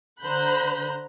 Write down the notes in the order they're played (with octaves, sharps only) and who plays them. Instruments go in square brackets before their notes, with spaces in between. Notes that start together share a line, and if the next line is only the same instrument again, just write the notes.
[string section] D3 C5 A#5 B5 F#6 G6